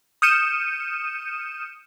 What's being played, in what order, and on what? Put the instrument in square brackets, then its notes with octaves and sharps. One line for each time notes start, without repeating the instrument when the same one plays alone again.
[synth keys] D#6 F6 G6 C#7 D#7 E7